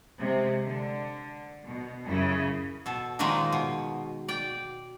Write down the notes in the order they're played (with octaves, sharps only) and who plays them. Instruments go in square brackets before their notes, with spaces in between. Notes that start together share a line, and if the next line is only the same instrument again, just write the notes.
[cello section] C3 G#3
D3
B2
F#2 C#3 C#4 E4
[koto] B2 A4
A#2 D#3 F3 G#3 A#3 D#4
B2
D5 G5